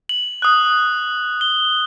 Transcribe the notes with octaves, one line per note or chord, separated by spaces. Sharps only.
F#7
D#6 F#6
G7